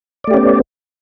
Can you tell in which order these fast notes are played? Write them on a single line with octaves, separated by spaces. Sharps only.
D5 A3 G4 C#4 B3